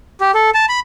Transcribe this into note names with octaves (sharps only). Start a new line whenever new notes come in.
G4
A4
A5
B5